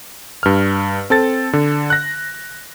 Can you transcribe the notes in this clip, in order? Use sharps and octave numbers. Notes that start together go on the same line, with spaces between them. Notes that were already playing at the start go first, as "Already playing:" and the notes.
G2 F6
C4 A4 A6
D3
F#6 A#6